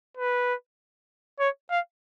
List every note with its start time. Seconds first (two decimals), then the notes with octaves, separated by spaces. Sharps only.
0.17 B4
1.40 C#5
1.70 F5